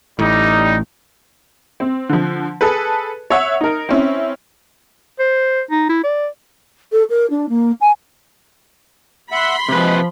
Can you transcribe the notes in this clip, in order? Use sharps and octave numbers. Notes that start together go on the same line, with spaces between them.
A1 A2 G3 D#4
C4
D3 F3
G#4 A4 B4
C#5 E5 F#5
D#4 A#4
C4 C#4 E4
C5
D#4
E4
D5
A4
A#4
D4
A#3
G#5
E5 F#5 B5 C6
C3 F3 G#3 B4